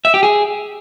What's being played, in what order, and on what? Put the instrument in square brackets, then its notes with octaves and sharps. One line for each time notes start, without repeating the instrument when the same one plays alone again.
[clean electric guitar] E5
G4
G#4